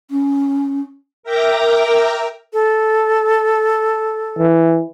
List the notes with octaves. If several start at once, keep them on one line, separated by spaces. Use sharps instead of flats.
C#4
A#4 E5 G5 A#5 D6 A#6
A4
E3